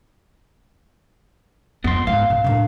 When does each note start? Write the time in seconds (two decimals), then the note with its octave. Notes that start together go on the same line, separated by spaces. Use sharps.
1.84 F2 B3 C6
2.07 G#2 F5
2.30 B2
2.44 A2 D4